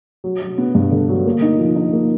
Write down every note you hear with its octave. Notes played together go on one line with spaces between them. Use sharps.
F#3
F#3
B3
G2
D3
F#3
A#3
D#4
F3
D#4
A#3